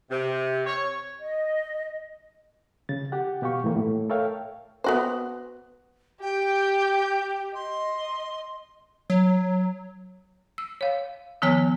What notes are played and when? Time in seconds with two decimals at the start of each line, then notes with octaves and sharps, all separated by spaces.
0.11 C3
0.66 C#5
1.21 D#5
2.89 C#3 A6
3.12 G4 F#5
3.42 B2 G4 F5 G5 C#6
3.64 A2 E3 A#3
3.76 A2
4.10 A4 A#4 C#5 E5 F5 G5
4.84 B3 F#4 C5
6.22 G4 G5
7.55 D#5 C6
9.10 F#3
10.58 E6
10.81 C#5 F5
11.42 D#3 F3 B3 C#5 G#5 F6